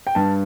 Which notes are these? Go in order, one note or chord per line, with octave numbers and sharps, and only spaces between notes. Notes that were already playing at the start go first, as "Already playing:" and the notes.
G5
G2 A5